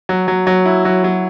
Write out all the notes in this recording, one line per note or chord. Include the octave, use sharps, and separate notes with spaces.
F#3
F#3
F#3
E4
F#3
F#3